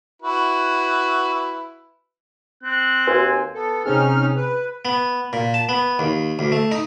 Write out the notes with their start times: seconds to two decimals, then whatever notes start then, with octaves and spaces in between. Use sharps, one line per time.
0.22 E4 F#4 B4
2.63 C4 F#6
3.07 D#2 F#4 A#4 B4 G#5
3.54 B3 A4
3.85 C3 C4 C#4 D#4 G#4 F6
4.36 B4
4.85 B3
5.33 A#2
5.54 A5
5.69 B3
5.99 D#2
6.39 D2
6.52 A3
6.72 D#4